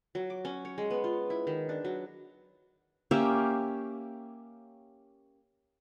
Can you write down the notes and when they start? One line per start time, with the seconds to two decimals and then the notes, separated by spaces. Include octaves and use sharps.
0.15 F#3
0.30 D6
0.45 C#4
0.65 C#5
0.78 G#3
0.90 B3
1.04 F4
1.30 E4
1.47 D#3
1.69 D4
1.85 F#3
3.11 A#3 C#4 G4 E5